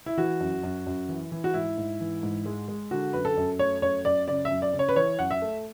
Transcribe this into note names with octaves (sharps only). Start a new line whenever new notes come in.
E4
E3 F#4
F#2
F#2
F#2
E3
E3
F#4
G#2 E4
G#2
E3
G#2
G#3
G#3
D3 F#4
F#2 B4
A4
F#2
A3 C#5
F#2 C#5
F#2 D5
C#3 D5
E5
F#2
D5
C#3
C#5
B4
E3 C#5
F#2 F#5
E5
A3